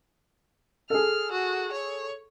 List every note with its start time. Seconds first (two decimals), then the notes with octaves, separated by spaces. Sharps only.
0.90 G#4 A4 F6
1.32 F#4
1.72 C#5